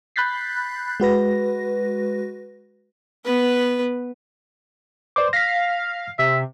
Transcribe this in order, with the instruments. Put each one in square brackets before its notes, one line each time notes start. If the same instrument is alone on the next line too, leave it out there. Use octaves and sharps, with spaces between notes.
[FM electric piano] B5 F#6 G6 A6 B6 C7
G#3 F#4 B4 A#6
[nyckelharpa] B3 B4
[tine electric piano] B4 D5 D6 [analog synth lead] C5
[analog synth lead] F5 [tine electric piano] A#6 B6
[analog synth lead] C3 [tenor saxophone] E5